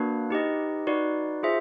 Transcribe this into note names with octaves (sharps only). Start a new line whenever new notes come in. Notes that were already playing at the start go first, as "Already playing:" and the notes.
Already playing: A#3 D4 F#4 B4
D#4 G4 B4 D#5
D#4 F#4 B4 D5
F4 G#4 C5 E5